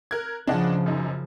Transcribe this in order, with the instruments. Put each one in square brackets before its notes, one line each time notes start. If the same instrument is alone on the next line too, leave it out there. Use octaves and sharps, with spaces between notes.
[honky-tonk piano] A#4 F#6 G#6
[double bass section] C#3 F3 [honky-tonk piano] D4 D#5 F#5
[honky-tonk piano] F#2 D#4